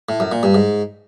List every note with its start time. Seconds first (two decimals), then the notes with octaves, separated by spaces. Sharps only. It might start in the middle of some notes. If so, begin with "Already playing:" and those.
0.09 A2
0.20 F#2
0.32 A#2
0.43 G2
0.55 G#2